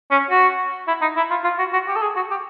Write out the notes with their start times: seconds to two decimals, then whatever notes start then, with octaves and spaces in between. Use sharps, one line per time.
0.11 C#4
0.30 F#4
0.87 E4
1.01 D#4
1.16 E4
1.30 F4
1.44 F4
1.59 F#4
1.73 F#4
1.88 G4
1.96 A4
2.02 G#4
2.16 F#4
2.30 G4